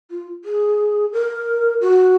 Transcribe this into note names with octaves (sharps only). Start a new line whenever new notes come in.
F4
G#4
A#4
F#4